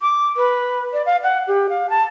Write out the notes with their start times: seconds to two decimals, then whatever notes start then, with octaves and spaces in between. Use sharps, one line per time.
0.01 D6
0.37 B4
0.93 D5
1.06 F5
1.23 F#5
1.47 G4
1.69 F5
1.90 A5